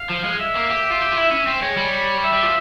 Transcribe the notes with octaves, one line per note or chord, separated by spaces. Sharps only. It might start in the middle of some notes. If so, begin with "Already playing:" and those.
Already playing: F5
F3
G#3
E5
A#3
G4
F4
G4
F4
E4
C#4
C4
G#3 C#5
G3
E5
G3
F3